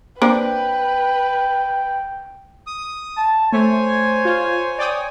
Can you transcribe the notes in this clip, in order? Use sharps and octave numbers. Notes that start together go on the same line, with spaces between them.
A#3 C4 D4 B4 G5
D#6
A5
A3 C5 C#5 G#5
F4
D5 G5 D#6